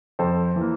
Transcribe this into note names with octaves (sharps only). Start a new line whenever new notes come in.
F2 A4 C5
E3
A#3